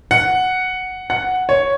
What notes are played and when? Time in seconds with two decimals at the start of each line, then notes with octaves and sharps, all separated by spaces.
0.11 F#5
1.10 F#5
1.49 C#5